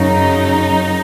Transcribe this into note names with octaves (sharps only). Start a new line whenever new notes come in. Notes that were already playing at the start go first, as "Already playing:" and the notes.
Already playing: F#2 C#3 F#3 D#4